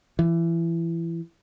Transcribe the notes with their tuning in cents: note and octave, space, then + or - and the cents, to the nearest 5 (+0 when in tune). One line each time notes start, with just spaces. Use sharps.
E3 +20